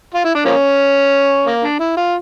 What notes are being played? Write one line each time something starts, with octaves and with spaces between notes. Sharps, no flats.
F4
E4
D4
F3 A#3 C#4
A#3
D4
E4
F4